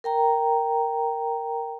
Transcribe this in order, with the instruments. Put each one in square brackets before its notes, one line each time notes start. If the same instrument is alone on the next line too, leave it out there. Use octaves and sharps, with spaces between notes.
[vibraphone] A#4 G5 A#5